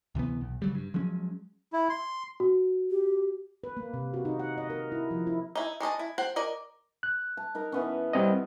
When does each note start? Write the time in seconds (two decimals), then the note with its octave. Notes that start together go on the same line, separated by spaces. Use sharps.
0.15 D2 C3 E3 B3
0.41 B1
0.62 C#3 F#3 G3
0.75 G2
0.94 F3 F#3 G#3 C#4
1.73 E4
1.89 C6
2.40 F#4
2.90 G4
3.64 B4
3.77 A#3
3.94 C3
4.14 F#4
4.25 D#4
4.39 F#5
4.58 D#5
4.70 A#4
4.92 E4
5.11 F3
5.27 E4
5.55 D#4 E4
5.80 G#3 D#4 D#5 A5
5.99 E4
6.18 C5 F#5 G5
6.36 A#4 D5 D#5
7.03 F#6
7.37 A5
7.55 D#4 A#4 A#5
7.72 E3 B3 C#4
8.13 G3 C4 D#5